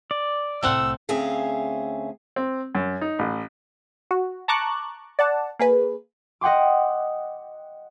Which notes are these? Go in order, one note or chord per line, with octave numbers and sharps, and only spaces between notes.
D5
C2 A2 A3 C4 F#5 E6
D2 C4 C#4 G#4 E5 F5
C4
F#2
D#4
A1
F#4
A5 A#5 C#6 D6 F#6
D5 F#5 A5
A#3 G#4 B4
D#5 F#5 G5 C6 D6